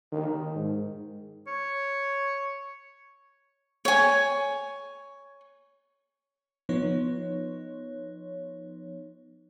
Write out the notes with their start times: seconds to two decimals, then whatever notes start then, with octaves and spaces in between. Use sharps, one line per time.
0.12 D#3
0.55 G#2
1.47 C#5
3.85 C#5 G#5
6.69 F3 B3 D#4 C#5